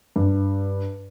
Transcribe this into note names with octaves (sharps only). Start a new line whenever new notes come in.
G2